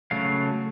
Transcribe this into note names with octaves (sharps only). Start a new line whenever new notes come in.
C#3 F#3 A3 F5